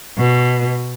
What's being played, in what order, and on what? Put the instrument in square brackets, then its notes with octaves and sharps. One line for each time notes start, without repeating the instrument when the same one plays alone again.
[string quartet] B2